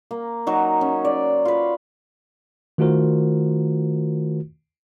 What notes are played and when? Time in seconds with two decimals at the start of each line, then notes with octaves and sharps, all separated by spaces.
0.11 A#3
0.47 F#3 D#4
0.81 C#4
1.05 D5
1.45 F4 B4
2.78 D#3 A3 F4 F#4 A#4 C5